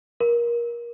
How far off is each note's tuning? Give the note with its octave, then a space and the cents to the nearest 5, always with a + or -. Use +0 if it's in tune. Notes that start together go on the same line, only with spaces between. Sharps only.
A#4 +25